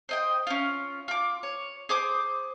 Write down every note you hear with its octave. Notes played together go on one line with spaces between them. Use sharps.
C5 D#5 G5
C#4 F4
F4 D6
C#5
G#4 C5 D6 D#6